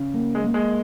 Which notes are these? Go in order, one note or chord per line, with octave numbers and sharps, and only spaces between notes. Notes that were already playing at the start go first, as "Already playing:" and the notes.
Already playing: C#3
A#3
G#3
A#3
G#3